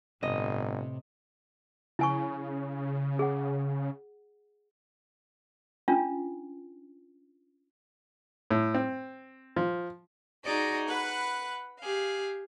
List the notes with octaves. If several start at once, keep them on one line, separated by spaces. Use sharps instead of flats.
G1 A2 C3 D#5
C#3 E4 G#5 C#6
G#4 F#5
C#4 D4 F4
A2
C4
F3
D#4 F#4 G#4 D5 D#5
B4 F#5 B5
G4 G#4 F5